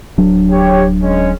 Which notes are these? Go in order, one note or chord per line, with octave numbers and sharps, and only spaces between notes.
D1 F#3 D4
G4 C#5
G#3 C#4